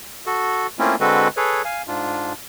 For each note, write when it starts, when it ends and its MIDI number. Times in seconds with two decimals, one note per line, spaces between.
0.27 0.67 66
0.27 0.67 69
0.79 0.96 57
0.79 0.96 58
0.79 0.96 60
0.79 0.96 61
0.79 0.96 64
0.79 0.96 65
1.00 1.28 50
1.00 1.28 56
1.00 1.28 60
1.00 1.28 66
1.00 1.28 69
1.00 1.28 71
1.37 1.62 68
1.37 1.62 69
1.37 1.62 71
1.37 1.62 73
1.65 1.82 77
1.65 1.82 80
1.88 2.33 44
1.88 2.33 62
1.88 2.33 65